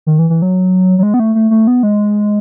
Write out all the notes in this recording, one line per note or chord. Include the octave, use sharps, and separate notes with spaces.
D#3
E3
E3
F#3
F#3
G#3
B3
A3
A3
A3
B3
G#3